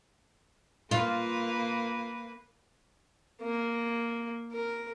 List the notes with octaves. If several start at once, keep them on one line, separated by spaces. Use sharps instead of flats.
A#3 F4 B4
A#3
A#4